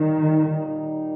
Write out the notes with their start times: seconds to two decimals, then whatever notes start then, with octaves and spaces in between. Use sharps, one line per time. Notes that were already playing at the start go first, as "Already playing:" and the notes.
Already playing: A#2 D#3 G3 A#3 D#4